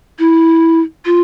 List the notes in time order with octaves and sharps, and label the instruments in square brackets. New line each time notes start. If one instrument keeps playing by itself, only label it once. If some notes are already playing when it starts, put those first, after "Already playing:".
[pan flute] E4
F4